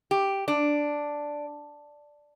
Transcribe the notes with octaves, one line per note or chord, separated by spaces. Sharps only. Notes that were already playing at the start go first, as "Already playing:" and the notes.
G4
D4